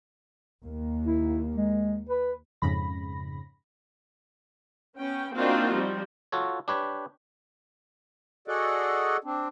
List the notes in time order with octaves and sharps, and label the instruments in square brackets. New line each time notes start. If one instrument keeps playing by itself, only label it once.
[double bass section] D#2 A#3
[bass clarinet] E4
G#3
B4
[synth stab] F2 G#2 C#3 B5 A#6
[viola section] B3 C#4 G5
A#3 C4 D4 D#4 F4 F#4
F3 G3 C4
[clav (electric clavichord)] F4 F#4 A4 C#5
D4 G4 B4 C#5
[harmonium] F#4 G#4 A4 D5 D#5 F#5
C4 D4